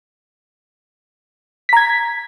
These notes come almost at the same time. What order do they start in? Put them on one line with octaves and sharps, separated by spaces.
B6 A#5 G#6